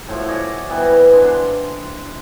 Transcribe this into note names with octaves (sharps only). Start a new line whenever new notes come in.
A2 F3 F#4
F#4 D5 D#5 G#5
E3 G3 B3
G#3 B3 D4
C6